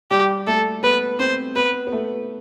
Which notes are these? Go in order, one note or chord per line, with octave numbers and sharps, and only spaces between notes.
G3 G4
A3 A4
B3 B4
C4 C5
B3 B4
B3
A3